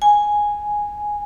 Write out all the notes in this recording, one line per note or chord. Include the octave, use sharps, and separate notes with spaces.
G#5